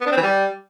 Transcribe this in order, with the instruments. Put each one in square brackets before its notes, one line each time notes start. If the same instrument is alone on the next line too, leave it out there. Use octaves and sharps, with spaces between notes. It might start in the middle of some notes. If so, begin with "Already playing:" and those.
[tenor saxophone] B3
D4
C4
E3
G3